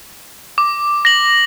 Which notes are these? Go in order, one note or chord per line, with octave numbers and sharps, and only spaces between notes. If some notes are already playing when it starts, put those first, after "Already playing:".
D6
A#6 F#7